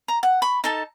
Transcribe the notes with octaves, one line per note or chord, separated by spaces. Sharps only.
A#5
F#5
B5 C#6
D#4 A4 A5